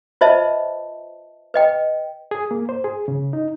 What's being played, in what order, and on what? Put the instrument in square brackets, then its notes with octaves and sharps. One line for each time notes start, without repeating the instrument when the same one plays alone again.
[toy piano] F4 B4 C5 D#5 E5 A5
B4 D#5 G5
[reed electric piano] G#4
A#3
C5
G#4
C#3
D#4